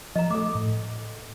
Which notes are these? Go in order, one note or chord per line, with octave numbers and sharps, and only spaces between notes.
F3 D#5 A#5
A3 A4 D6
A2